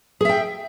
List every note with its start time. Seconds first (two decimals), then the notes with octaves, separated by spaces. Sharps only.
0.21 G#4
0.25 E5
0.29 G5